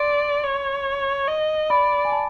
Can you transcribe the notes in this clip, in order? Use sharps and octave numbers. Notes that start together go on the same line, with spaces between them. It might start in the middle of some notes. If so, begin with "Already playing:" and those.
Already playing: D5 C6
C#5
D#5
D5 B5
G#5
A5